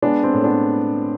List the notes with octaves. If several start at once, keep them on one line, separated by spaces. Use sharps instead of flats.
G#3 B3 D4
C4
A2
B3 D4